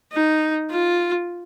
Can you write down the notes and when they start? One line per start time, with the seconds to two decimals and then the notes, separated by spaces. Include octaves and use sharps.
0.12 D#4
0.70 F4